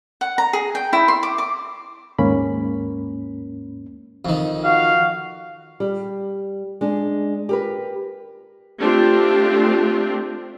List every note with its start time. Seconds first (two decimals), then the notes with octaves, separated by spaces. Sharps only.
0.21 F#5
0.38 A#5
0.53 G#4
0.75 G5
0.93 E4
1.08 C6
1.23 D6
1.38 D6
2.19 D#2 G#2 A#3 C#4 A#4 B5
4.25 F2 D#3
4.64 F#4 F5
5.80 G3
6.81 G#3 D4
7.49 G4 A#4 B4
8.79 A3 C4 D4 F4 G4